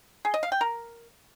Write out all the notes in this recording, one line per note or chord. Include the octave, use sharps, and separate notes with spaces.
G#4
D#5
F5
G5
A#4